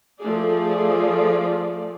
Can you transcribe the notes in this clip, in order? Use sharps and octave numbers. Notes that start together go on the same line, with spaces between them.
F3 A3 G#4 D5